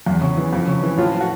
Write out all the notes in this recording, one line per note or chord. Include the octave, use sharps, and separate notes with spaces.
E2
C#3
E3
F2
C#3
E3
A2 F4
F3
F#4